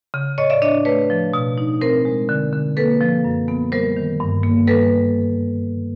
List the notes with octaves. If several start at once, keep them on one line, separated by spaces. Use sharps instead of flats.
C#3
A2 C#5 D#5
D5 E5
D4 C#5 D#5
A3 B4 C#5
F3
B2
D#4
C4 A#4 C5
G#3
D3
D3
A#3 A4 B4
F3
F#2
B3
G3 A#4 C5
D#3
G2
A#3
G3 A4 B4